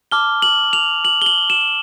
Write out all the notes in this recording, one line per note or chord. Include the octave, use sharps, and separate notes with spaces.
A5 D6 F6 G7
F#7
F7
F#7
G7
F#7
E7